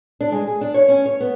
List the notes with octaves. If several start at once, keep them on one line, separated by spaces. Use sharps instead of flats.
D4
G#3
G#4
D4
C#5
C#4
C#5
B3